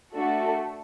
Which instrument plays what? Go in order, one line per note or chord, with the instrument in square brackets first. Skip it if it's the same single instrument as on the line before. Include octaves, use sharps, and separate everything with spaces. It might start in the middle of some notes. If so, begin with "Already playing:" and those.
[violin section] A3 D4 F#4 A4